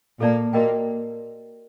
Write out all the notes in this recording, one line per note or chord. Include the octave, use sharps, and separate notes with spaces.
A#2 A#3 A4 D5 A5
A#2 A#3 F#4 A#4 D#5 G5